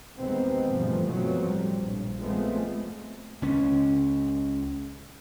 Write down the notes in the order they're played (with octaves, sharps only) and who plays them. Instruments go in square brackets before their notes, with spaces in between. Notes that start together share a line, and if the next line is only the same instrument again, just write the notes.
[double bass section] D#2 C3 D#3 G#3 B3 C4
G1 B2 E3 F3 A3
B2 F3 F#3 A3 C4
A2 G3
A#1 G2
F3 G#3 A3 B3 C4
[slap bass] C#2 C#4